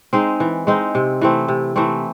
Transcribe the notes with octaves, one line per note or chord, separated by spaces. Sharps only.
G#3 C4 D#4
E3
G#3 C4 D#4
C3
E3 A3 C4
C3
E3 A3 C4